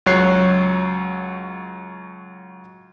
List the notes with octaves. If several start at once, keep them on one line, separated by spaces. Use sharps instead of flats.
C#2 F#3 C#5 F#6 C7